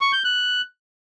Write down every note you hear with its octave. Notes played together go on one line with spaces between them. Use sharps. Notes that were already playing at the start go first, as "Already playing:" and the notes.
C#6
G6
F#6